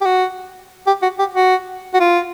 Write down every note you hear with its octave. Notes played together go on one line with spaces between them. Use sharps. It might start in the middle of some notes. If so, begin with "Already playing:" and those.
G4
F#4
G4
F#4
G4
F#4
F#4
F4